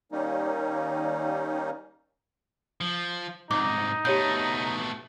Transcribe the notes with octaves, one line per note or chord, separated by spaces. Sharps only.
D#3 G3 A#3 C#4 D#4
F3
C2 G#2 D#4 D6
B2 A3 G4 C#5 G6